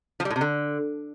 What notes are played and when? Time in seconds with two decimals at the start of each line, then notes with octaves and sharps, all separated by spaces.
0.20 F3
0.25 G3
0.30 A2
0.36 C3
0.41 D3